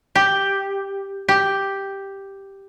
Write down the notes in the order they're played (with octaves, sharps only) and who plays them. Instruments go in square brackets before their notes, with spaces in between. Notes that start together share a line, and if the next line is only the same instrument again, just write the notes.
[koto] G4
G4